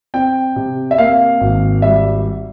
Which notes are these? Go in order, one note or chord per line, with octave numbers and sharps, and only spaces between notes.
C4 G5
C3
E5
A#3 F5
G#1
G3 E5